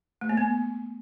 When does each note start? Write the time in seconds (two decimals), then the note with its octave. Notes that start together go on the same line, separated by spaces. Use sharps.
0.21 A3
0.29 A#3
0.37 B3